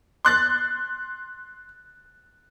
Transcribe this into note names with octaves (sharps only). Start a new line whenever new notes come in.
C6 F#6 A6